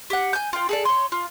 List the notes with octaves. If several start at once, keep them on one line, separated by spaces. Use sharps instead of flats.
G4 F#5
G#5 G6
F4 G5
G#4 A4 D5
C#5 C6
F4